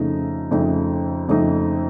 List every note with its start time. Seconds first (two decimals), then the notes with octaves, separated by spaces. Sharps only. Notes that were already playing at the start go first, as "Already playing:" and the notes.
Already playing: F2 C#3 A3 D#4
0.51 F2 C#3 A3 D#4
1.29 F2 C#3 A3 D#4